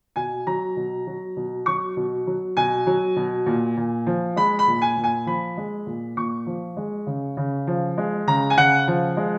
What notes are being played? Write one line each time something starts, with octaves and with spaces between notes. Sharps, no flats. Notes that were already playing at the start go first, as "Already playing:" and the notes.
B2 G#5
F#3 A#5
B2
F#3
B2
F#3 C#6
B2
F#3
B2 G#5
F#3
B2
A#2
A#2
F3
G#3 B5
B5
A#2
G#5
A#2
G#5
F3 B5
G#3
A#2
A#2 C#6
F3
G#3
C#3
C#3
F3
G#3
C#3 A#5
G#5
C#3 F#5
F3
G#3